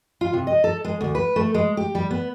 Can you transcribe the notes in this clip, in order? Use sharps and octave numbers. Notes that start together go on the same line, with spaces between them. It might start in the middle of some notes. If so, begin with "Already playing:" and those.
F4
C3
D#5
A4
G#3
D2
B4
A3
G#3
G4
G3
B3